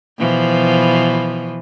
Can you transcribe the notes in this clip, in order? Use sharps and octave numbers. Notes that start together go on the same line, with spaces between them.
B2 E3 F3